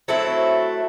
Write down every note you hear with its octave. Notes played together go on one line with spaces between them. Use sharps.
F#3 A3 C4 E4